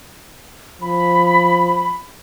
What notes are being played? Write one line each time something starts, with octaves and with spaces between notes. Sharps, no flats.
F3 B5